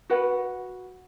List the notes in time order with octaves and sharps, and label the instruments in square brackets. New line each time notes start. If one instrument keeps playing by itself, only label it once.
[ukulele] F#4 B4 F#5